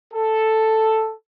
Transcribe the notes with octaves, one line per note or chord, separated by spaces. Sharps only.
A4